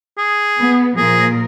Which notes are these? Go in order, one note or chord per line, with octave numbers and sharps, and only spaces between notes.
G#4
B3
A#2 F3 G#4 A#4